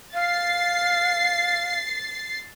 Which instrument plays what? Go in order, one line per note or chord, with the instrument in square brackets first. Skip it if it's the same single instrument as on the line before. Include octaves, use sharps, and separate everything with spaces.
[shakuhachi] F5 [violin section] A6 C7